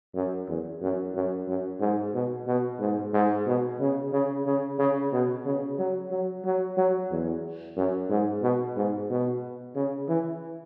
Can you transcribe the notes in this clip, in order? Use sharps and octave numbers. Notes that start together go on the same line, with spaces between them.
F#2
E2
F#2
F#2
F#2
G#2
B2
B2
G#2
G#2
B2
C#3
C#3
C#3
C#3
B2
C#3
F#3
F#3
F#3
F#3
E2
F#2
G#2
B2
G#2
B2
C#3
E3